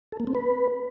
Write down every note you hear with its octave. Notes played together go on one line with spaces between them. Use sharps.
A4
A#3
C4
B4